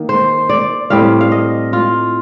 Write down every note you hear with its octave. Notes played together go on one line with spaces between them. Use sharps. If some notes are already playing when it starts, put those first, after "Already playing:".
Already playing: D#3 A#3
C5
D5
A2 G3 C4 F5
F5
D#5
F4